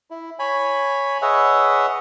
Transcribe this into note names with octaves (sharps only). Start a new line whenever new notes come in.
E4
C#5 G#5 B5
G#4 B4 C#5 D#5 E5 F#5